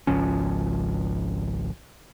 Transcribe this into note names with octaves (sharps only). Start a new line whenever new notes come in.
G#1 C#2 F3 C#4